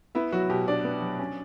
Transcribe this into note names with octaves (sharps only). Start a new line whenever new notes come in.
B3 E4 E5
F#3 F#4
B2 G4
D4 D5
B3
F#3
C#4